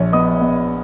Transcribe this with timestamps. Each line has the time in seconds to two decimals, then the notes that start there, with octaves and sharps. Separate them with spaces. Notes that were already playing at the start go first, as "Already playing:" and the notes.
Already playing: A#1 C#5
0.13 B3 D#5 D#6
0.40 B3